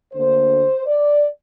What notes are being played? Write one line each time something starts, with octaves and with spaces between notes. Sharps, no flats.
D2 D3 A#3 C5
D5